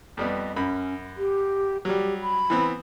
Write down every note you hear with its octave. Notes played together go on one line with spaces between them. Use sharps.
F2 G3 B3 D#5
F#2 C#4 B5
G4
F#3 G3 G4
B5
E3 B3 C4